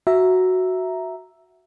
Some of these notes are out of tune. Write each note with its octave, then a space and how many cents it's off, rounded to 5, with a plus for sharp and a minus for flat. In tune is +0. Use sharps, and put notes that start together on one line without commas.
F#4 +0 E5 +0 A#5 +0